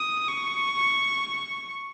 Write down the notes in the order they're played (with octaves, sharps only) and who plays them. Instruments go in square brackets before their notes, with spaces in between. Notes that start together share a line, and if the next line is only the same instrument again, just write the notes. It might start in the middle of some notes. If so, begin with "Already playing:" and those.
Already playing: [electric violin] D#6
C#6